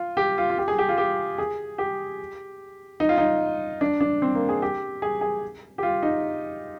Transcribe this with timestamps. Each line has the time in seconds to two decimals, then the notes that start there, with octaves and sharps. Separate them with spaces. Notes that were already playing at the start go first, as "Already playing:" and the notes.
Already playing: F4
0.17 G4
0.38 F4
0.50 F4
0.58 G4
0.68 G#4
0.79 G4
0.89 F4
0.98 G4
1.38 G#4
1.78 G4
3.00 D#4
3.09 F4
3.18 D#4
3.81 D4
4.01 D4
4.22 C4
4.35 A#3
4.49 G#4
4.62 G4
5.02 G#4
5.21 G#4
5.78 G4
5.83 F4
6.02 D#4